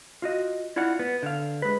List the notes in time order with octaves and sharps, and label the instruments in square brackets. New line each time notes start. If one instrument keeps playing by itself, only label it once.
[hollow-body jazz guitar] F4 F#4 D#5
E4 F4 D5 F5 F#5
B3
D3 F5
G#3 B4